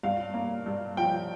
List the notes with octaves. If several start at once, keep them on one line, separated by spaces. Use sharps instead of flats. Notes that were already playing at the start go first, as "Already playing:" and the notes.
G2 F5
A#3
G2
F3 G5